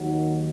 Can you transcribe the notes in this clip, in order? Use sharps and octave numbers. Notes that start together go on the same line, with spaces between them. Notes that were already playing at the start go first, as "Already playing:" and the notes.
Already playing: D#2 D#3 F#3